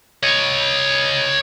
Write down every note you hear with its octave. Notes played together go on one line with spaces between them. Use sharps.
C#5 D#5